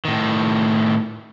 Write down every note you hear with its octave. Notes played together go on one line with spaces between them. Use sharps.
A2 D#3